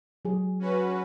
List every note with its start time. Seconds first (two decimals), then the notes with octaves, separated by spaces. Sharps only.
0.25 F#3 G#4
0.59 C#4 F#4 B4